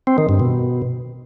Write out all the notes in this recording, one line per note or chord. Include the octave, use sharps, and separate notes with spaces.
C4
D#3
G2
B2